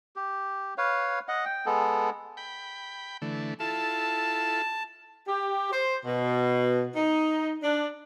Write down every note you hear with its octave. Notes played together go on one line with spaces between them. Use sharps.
G4
B4 C#5 F5
D#5 F#5
G5
G#3 B3 A4
G5 B5
D3 E3 A3
E4 F4 A4 A5
G4
C5
B2
D#4
D4